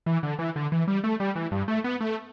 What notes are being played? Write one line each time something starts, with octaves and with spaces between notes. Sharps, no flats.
E3
D3
E3
D3
E3
G3
A3
G3
E3
G2
A3
B3
A3